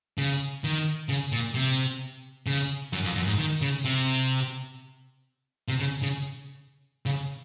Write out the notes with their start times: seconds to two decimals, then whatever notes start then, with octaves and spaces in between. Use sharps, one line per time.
0.18 C#3
0.64 D#3
1.09 C#3
1.32 A#2
1.55 C3
2.46 C#3
2.93 F#2
3.04 F2
3.16 F#2
3.27 G#2
3.38 D#3
3.62 C#3
3.85 C3
5.68 C3
5.79 C#3
6.03 C#3
7.06 C#3